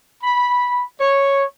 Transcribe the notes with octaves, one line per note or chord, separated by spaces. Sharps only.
B5
C#5